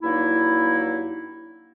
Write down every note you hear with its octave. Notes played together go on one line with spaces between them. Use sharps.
G2 F#3 A#3 D#4 E4